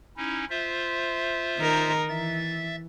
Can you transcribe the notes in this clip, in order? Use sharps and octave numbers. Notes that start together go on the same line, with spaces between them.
C#4 D#4 E4
F4 C5 E5
D#3 D#4 A#4
E3 E5 A6